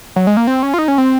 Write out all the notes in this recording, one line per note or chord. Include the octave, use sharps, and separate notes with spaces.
F#3
G#3
A#3
C4
C#4
F4
D#4
C#4
C4